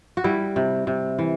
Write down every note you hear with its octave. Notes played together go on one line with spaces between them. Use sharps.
F#4
G3 E4
C3
C3
E3